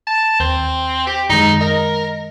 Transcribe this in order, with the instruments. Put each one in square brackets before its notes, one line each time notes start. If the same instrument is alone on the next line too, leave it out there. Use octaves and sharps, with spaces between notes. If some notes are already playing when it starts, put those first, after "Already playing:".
[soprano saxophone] A5
[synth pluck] D#2 G6 [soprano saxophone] C4
[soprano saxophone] G4
[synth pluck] F#2 D#3 G#3 [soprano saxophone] D#4
[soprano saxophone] A#4 [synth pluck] D#5